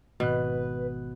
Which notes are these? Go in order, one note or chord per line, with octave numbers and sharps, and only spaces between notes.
G#1 B2 B4 F#6